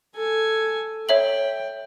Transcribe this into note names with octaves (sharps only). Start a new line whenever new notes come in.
A4 G#5
C#5 E5 G5 F#7